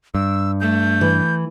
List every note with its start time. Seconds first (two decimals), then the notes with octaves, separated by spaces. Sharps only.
0.15 G2 E6
0.60 A3 G6
1.01 E3